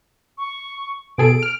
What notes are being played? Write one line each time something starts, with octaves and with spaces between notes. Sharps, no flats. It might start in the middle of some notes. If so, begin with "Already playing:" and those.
C#6
B2 G#4 A4 D7
F6